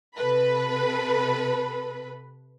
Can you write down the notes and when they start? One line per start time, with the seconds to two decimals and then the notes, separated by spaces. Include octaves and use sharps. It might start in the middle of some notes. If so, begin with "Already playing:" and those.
0.16 C3 A4 B4 B5